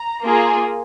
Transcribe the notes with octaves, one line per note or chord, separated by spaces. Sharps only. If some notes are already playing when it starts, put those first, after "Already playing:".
Already playing: A#5
A#3 F4 G#4